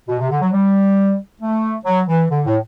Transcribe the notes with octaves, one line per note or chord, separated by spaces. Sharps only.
B2
C3
D3
F#3
G3
A3
F#3
E3
D3
A2